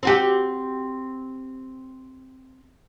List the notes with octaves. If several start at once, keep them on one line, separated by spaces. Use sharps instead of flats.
C4 F#4 G4